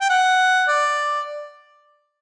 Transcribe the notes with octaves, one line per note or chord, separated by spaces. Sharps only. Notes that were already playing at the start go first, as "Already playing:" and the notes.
G5
F#5
D5